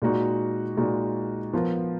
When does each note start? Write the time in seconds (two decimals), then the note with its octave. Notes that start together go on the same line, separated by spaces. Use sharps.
0.02 A#2 G#3 D#4 F#4
0.77 A#2 G#3 D#4 F#4
1.53 F3 B3 F4 A#4